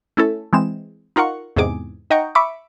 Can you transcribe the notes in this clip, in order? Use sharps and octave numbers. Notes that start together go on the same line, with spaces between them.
A3 C#4 E4 A4
E3 G#3 C4 E7
D#4 F4 A#4 F#5 C#6
E2 G#2 C3 G#4 D6
D#4 D#5 F#5 G5 A#5 C#6
E5 B5 C#6 D6